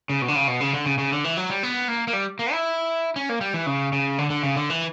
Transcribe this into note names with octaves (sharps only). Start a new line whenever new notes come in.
C#3
B2
D3
C#3
B2
C#3
D3
C#3
C#3
D3
E3
F#3
G3
B3
A#3
A#3
G3
A#3
E4
C#4
A#3
G3
E3
C#3
C#3
D3
D3
C#3
D3
E3